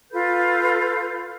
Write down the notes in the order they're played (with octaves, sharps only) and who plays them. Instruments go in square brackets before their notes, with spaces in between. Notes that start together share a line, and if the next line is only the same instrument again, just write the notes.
[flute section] F4 A4 B4 G6